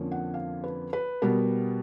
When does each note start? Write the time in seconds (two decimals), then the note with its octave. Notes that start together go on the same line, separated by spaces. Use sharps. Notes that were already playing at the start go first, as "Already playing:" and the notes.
Already playing: F2 D3 F3 A#3 C#4
0.12 F#5
0.34 F5
0.64 B4
0.93 B4
1.22 B2 G3 B3 A#4